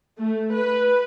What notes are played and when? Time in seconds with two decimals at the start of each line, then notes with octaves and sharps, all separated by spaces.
0.19 A3
0.54 B4